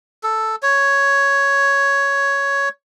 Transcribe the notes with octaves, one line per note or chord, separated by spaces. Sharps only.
A4
C#5